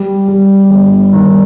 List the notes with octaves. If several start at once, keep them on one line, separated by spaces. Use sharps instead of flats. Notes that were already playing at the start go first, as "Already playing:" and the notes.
Already playing: G3
G3
G1
D#3